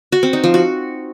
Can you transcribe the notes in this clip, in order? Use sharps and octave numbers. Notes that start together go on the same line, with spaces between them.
F#4
C4
D#4
F3
F#4